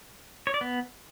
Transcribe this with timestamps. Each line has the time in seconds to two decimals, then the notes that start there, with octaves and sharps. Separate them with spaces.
0.47 C#5
0.54 D5
0.61 B3